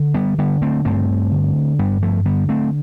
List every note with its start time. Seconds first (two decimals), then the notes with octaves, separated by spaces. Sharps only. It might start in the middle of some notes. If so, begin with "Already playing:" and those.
Already playing: D3
0.14 G3 B3
0.38 D3 G3 B3
0.62 A3 C4
0.85 G2 A3 C4
1.32 D3
1.79 G2 G3 B3
2.02 F3 A3
2.25 D3 G3 B3
2.49 A3 C4